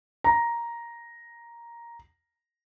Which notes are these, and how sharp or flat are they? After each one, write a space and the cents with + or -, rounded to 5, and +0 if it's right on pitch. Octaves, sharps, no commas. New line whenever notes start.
A#5 +5